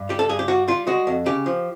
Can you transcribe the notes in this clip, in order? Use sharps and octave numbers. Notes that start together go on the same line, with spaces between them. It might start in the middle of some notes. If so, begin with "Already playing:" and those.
Already playing: G2
G3 G4
A4
G2 G#4
G4
G3 F#4
G3 F4
G#3 F#4
F2
C#3 G4
F3